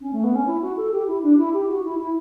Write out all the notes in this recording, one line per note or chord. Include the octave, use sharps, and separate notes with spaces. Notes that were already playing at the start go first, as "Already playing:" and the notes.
C#4
A3
B3
C#4
E4
F#4
A4
G4
E4
D4
E4
G4
F#4
E4
E4